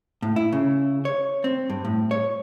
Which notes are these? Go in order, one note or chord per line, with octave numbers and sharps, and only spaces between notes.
A2
E4
C#3
C#5
C4
G2
A2
C#5